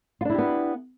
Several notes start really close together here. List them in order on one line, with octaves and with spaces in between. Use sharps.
F4 D4 E4 G4 B3